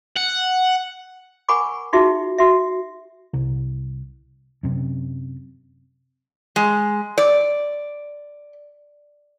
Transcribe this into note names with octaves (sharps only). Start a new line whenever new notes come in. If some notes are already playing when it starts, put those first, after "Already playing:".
F#5
A#4 F#5 G#5 B5 C#6 D6
D#4 F4 F#4 G#4 E5
F#4 E5
C2
F#2 C3
G#3
D5